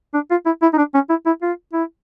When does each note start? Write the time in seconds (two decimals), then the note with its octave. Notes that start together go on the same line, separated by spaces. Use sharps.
0.14 D4
0.31 F4
0.46 E4
0.62 E4
0.73 D#4
0.78 D4
0.94 C#4
1.09 E4
1.26 E4
1.42 F4
1.73 E4